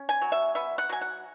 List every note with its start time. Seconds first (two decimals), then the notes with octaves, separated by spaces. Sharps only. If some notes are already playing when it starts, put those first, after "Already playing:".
Already playing: C#4
0.09 G#5
0.22 F#3
0.32 E5
0.55 B3 E5
0.78 F#5
0.89 F#3 G#5
1.01 F#5